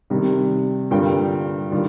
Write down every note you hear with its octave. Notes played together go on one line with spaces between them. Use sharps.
C3 D#3 G3
G2 D3 G3 A#3 F4 G5
D#3 G3 D4 F4